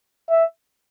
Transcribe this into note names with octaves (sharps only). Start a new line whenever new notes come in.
E5